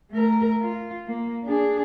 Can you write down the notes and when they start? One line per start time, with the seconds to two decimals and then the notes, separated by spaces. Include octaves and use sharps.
0.11 A3 A#4
0.61 F4
1.07 A#3
1.44 D4 G#4